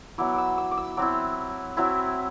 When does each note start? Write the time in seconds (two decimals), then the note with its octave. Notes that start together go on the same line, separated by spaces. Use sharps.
0.18 F#3 B3 E4 D6
0.34 D6 E6
0.58 E6
0.71 D6
0.77 E6
0.97 F#3 C4 E4 D6
1.77 F#3 C4 E4